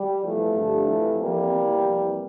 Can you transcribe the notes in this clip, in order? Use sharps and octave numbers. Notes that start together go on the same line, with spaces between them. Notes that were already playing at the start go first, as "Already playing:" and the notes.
Already playing: G3
E2 C3 E3 F3 A3
G2 D3
F2 C3 E3
F2 E3 G3 A#3
E2 C3 E3
F2 C3 E3